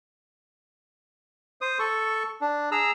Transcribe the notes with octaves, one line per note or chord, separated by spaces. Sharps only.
C5 D#6
A4 C#6
D4
G#4 A#5 E6